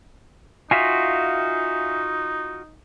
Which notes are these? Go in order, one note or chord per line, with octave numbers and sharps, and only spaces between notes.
D#4 F4 F#4 E5 F5 G#5